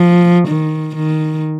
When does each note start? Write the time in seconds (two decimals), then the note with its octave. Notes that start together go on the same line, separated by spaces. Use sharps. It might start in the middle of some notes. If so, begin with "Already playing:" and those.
Already playing: F3
0.48 D#3
0.96 D#3